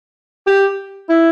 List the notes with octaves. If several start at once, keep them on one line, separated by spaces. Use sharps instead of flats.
G4
E4